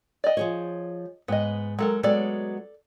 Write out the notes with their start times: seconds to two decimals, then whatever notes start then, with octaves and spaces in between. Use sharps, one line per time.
0.24 D5 D#5
0.37 F3 G#4 C#5
1.28 G#2 B3 D#5
1.79 F#3 G#3 A4 A#4
2.03 F#3 G#3 B3 A4 D5